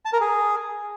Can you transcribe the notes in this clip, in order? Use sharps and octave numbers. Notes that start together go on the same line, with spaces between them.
A5
A#4
G#4